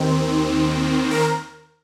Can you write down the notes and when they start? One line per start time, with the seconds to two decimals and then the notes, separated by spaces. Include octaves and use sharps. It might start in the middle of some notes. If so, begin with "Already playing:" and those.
Already playing: D#2 D#3 C4
1.11 A#4